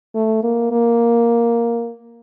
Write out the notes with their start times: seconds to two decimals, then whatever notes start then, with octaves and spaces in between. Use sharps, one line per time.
0.15 A3
0.43 A#3
0.72 A#3